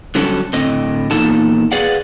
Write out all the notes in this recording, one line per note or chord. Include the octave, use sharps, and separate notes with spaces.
D3 F#3 G3 C#4 F#4 A4
A2 D3 C4 D#5
E2 A#2 A#3 D#4 A4 A5
G#4 B4 D5 F5 F#5